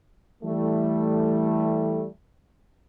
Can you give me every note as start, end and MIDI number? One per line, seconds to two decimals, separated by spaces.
0.43 2.05 52
0.43 2.05 55
0.43 2.05 57